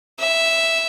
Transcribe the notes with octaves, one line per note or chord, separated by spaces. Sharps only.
E5